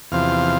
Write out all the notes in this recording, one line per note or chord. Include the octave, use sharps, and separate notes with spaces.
E2 C3 F3 F5